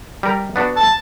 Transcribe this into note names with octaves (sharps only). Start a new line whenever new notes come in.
G3 A#4
B3 D4 F#4
A5